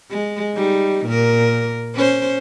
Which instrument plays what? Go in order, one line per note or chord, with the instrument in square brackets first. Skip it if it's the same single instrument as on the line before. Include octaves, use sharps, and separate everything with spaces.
[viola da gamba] G#3
G3 D#4
A#2 A#4
C#4 C5